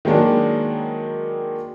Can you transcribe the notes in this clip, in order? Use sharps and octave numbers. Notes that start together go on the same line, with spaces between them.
D#3 F#3 G#3 A#3 D4